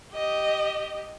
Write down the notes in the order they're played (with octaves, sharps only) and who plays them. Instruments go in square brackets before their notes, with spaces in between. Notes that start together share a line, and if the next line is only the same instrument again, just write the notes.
[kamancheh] G4 D#5